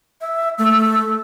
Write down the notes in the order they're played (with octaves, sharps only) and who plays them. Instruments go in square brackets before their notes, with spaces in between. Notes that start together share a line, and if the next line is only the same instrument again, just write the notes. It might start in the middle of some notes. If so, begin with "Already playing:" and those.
[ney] E5
[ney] A3 [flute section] E6